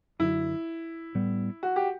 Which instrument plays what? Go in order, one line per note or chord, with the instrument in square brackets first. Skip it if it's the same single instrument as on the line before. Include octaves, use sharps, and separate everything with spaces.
[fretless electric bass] F#2 D3 F#3 [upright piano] E4
[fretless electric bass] A2 G3 B3
[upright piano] F#4
G4